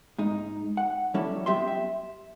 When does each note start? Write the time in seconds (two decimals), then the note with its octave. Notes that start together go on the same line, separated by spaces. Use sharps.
0.18 G#2 D#4
0.77 F#5
1.14 F#3 G3 C#4 E4 A4
1.46 B3 G4 E5 C6
1.68 E5